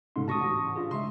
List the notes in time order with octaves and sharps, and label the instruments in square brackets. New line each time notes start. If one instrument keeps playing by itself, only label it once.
[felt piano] G#2 C#3 A3 [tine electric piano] C6
[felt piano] D2 A#6 [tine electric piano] A5 C#6 D#6
[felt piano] A1
[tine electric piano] D4 F4 G#4
[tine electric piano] C#3 G#3 [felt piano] E5 C6